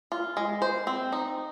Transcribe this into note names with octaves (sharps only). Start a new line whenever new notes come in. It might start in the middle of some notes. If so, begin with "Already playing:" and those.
F4
G#3
C5
C4
D#4